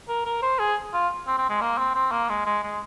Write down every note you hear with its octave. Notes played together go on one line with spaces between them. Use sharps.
A#4
A#4
C5
G#4
F4
C4
C4
G#3
A#3
C4
C4
A#3
G#3
G#3
G#3